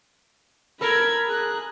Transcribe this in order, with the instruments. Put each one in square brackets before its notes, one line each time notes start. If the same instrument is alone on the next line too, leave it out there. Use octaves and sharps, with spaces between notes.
[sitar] A4 A#4 [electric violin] B5 G#6
[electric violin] G#4 F#6